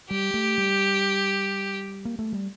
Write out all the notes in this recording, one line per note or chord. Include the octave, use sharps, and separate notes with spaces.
G3 G4
A3
G3
A#3
A3
G3